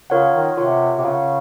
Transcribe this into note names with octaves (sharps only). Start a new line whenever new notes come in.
C#3 F4 A#4 C#5 F#5
D#3
C3 F4 A#4 C#5 F#5
C3
C#3 F4 A#4 C#5 F#5